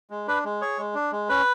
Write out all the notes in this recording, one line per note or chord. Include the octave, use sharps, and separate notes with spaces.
G#3
D4 B4
G#3
G#4 C#5
G#3
D4
G#3
C#4 B4